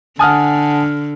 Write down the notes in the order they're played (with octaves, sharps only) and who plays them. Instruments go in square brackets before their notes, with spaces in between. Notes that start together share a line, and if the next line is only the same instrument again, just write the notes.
[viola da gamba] D3 [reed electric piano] F#5 A5 [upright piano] G#5 D#6 F6